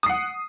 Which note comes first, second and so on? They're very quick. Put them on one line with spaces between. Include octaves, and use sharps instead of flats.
D#6 C7 F#5